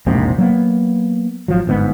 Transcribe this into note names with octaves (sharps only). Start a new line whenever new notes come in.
E1 A#1 G#2 C3
F#3 A#3 B3
G#1 F3 F#3
G1 G#2 B3